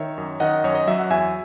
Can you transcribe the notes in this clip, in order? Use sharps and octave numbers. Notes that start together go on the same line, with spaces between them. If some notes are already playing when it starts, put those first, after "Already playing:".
Already playing: D#3 C#5 E5
F#2
D#3 D#5 F#5
F#2 C#5
D#5
F#3 E5
F#5
E2 E5 G#5